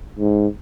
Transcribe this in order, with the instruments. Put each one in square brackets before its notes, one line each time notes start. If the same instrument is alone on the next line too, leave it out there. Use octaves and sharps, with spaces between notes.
[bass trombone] G#2